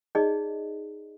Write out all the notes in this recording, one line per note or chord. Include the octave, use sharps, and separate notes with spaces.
D#4 G#4 D5 D#5